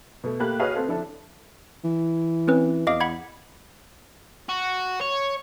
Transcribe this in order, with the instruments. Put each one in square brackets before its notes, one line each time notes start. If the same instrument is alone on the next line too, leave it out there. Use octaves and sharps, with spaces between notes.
[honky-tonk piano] B2 A3
A3 A#3 G4 B5 F#6
F#4 G#4 B4 C#5 D#5 F5
A3 C4 A4
F3 D4 E4 A4
[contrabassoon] E3
[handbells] C4 C#4 B4
[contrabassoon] E2 [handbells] D#5 F5 D6
[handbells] F#5 B5 G#6
[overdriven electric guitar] F#4
C#5